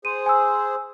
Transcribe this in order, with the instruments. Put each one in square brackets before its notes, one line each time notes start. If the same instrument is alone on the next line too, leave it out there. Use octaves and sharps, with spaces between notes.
[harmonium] G#4 C5 [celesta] D#7
[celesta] G#5 E6